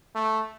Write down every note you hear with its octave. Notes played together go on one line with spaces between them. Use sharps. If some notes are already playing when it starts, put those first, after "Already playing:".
A3